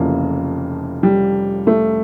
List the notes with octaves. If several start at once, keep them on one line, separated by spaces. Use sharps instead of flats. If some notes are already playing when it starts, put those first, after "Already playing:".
Already playing: F1 F2 C#3 E3 A#3
G3
A3